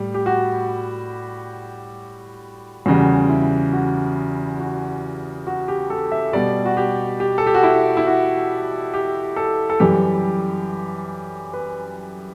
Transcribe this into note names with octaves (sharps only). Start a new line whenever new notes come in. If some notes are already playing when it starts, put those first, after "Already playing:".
Already playing: A2 G3 G4
G4
F#4
E2 C#3 G3 F#4
E4
F#4
F#4
F#4
G4
A4
E5
B2 G3 D5
F#4
G4
G4
A4
G4
F#4
E4
E4
F#4
G4
A4
A4
F#2 E3 G3 G4
B4